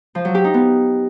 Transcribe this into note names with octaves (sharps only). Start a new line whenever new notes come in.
F3
F#3
G4
D#4
B3